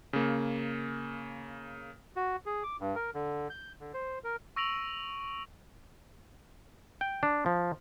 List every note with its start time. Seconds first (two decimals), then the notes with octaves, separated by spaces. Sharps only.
0.13 C#3 A#3
2.16 F#4
2.46 G#4
2.63 D6
2.80 G2
2.96 A#4
3.14 D3
3.50 G6
3.80 D3
3.94 C5
4.24 A#4
4.56 C#6 E6 A#6 D7 F7 F#7
7.01 G5
7.23 D4
7.46 F3